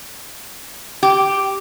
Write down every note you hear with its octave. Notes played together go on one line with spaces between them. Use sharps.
G4